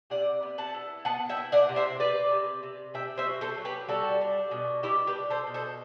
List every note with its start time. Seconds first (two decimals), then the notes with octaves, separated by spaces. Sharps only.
0.10 C3 D5 F#5
0.43 B3
0.58 F#5 A5
0.74 E4
1.05 B3 F#5 A5
1.29 E5 G5
1.37 E4
1.52 D5 F#5
1.69 C3
1.76 C5 E5
2.00 C3 B4 D5
2.31 C3
2.63 C3
2.94 C3 E5 G5
3.17 C5 E5
3.27 F#3
3.41 A4 C5
3.58 F#3
3.65 G4 B4
3.89 G3 F#4 A4
4.21 D4
4.51 B2
4.83 G3 E4 G4
5.07 G4 B4
5.15 D4
5.30 A4 C5
5.47 B2
5.54 A4 C5